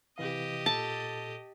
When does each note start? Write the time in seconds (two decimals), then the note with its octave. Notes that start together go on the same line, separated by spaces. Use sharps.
0.18 C3 E3 G4 D#5 F5
0.66 A#2 A4 A5